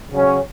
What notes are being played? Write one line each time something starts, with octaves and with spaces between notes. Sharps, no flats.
C#3 F#3 C#4